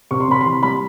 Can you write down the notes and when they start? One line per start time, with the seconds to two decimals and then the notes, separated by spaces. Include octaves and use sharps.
0.11 C3 C#6
0.20 C6
0.28 C3 B5
0.41 C6
0.46 E3
0.63 G3 B5